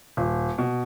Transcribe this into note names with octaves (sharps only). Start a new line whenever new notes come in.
D#1
B2